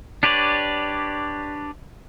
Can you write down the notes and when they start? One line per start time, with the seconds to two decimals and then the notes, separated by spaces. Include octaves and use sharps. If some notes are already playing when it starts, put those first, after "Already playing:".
0.23 D4 G4 B4 C#5 D5